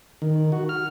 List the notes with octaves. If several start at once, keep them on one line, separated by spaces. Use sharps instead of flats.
D#3
F#4
F6